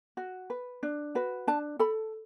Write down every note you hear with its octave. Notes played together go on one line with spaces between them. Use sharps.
F#4
B4
D4
F#4 B4
D4 A5
A4 B5